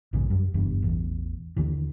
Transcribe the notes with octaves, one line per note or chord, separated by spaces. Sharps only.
A#1 E2 G#2 C#3
F#2 G3
F#1 E2 G2
E1 A1 E2
D#2 D3 E3